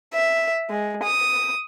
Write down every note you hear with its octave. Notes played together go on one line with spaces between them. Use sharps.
E5
G#3
D#6